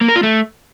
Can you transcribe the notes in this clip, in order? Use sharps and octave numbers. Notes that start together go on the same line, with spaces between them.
A#3
A#4
F4
A3